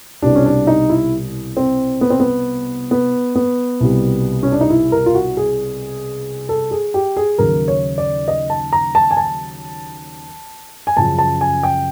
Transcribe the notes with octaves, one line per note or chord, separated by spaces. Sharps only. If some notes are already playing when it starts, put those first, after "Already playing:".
C2 B2 G3 D4
C#4
D4
D#4
E4
C4
B3
C4
B3
B3
B3
C2 B2 G3
C#4
D4
D#4
E4
A#4
F4
F#4
G#4
A4
G#4
G4
G#4
D#2 C#3 F#3 A#4
C#5
D5
D#5
A5
A#5
A5
G#5
A5
G#5
F#2 C#3 F3 A5
A5
G#5
G5